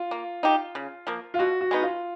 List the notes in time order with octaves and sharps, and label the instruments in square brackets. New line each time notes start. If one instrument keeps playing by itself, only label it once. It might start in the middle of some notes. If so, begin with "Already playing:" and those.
Already playing: [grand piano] F4
[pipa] A#3
D#4 G4
C#3
F3 A#3
[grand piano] F4
[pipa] B2 [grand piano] F#4
[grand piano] F#4
[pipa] G#3 B3 D#4
[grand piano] F4